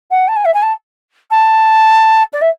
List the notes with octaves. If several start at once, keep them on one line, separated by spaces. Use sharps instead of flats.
F#5
A5
G#5
E5
G#5
A5
A5
D5
E5